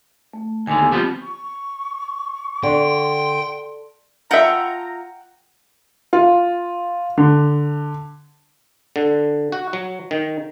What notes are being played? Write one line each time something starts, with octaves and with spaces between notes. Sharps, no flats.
A3
D#2 D3 G#5
B3 G4
F3 G3 B3 C4 F4
C#6
D3 G5 C6
F4 E5 F#5 G5 A#5 G6
F4
D3
D3
F#4
F#3
D#3